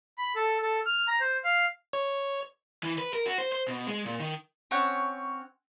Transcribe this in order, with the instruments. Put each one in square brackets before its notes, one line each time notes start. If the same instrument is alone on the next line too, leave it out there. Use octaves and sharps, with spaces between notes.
[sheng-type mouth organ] B5
A4
A4
F6
A#5
C5
F5
[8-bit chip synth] C#5
[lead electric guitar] E3
B4
A#4
F#4
C5
C5
B2
G#3
A#2
D#3
[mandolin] C4 C#4 C#5 F#5